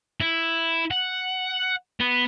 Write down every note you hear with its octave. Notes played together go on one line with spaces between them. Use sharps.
E4
F#5
B3